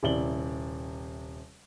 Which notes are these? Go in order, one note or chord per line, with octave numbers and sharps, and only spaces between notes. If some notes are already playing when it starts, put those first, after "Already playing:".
D#1 C3 E4 D5 F#7 G7